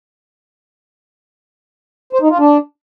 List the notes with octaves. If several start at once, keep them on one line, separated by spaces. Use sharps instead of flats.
C5
D#4
F4
D4